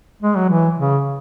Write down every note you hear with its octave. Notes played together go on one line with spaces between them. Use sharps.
G#3
F#3
E3
C#3